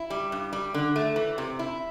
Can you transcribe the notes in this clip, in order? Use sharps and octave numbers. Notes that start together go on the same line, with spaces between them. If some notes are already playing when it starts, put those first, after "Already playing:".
Already playing: E4
G3
G2
G3
D3
A3
E3
C3
E4